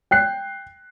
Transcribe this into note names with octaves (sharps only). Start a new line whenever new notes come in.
G5 F#6 C7